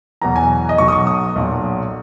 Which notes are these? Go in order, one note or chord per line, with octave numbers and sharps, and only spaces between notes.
E2 B2 F#3 A#5
G#5
D#5
B1 B2 F#3 C#6
D#6
C#6
D#6
B1 A#2 F#3